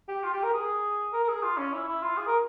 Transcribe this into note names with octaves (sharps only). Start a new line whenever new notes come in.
G4
F4
G4
A#4
G#4
A#4
A#4
G#4
F4
C#4
E4
E4
F4
G#4
A#4